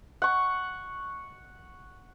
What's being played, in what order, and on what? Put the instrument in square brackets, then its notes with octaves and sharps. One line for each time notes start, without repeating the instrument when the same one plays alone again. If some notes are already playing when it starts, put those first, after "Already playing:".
[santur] F#5 C#6